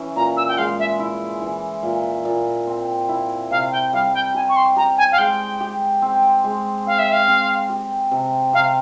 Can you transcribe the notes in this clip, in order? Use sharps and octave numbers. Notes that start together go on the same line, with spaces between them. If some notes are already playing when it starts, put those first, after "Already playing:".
Already playing: E3 C#4
A#2 A#5
E6
G5
G#3 F5
E5
E4
E3
A#2
A#2
C4
E4
C3 F5
G5
G3 F5
G5
G4 G#5
C#6
C6
G4 A#5
G#5
F5
G#3 G5
G4
C4
G#3
C4 F5
E5
F5
C4
G4
C3
C3 F5